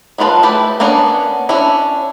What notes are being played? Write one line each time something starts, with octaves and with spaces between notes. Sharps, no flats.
F#3 B3 F4 B4 A5
A3 E4 G4 G#4 B4
A#3 B3 C#4 D4
C#4 D4 E4